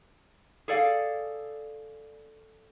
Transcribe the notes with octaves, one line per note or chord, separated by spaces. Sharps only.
G#4 A4 D5 F5